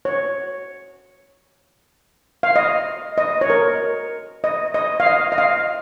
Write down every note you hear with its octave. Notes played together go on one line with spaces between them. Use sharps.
C#5
F5
D#5
D#5
C#5
A#4
D#5
D#5
F5
D#5
D#5
F5